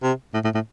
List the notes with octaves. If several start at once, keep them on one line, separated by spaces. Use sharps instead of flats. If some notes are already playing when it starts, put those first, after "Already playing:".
C3
A2
A2
A2